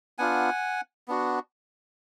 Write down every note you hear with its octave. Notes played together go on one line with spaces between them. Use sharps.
B3 D4 F4 F#5 G#5
B3 D4 F#4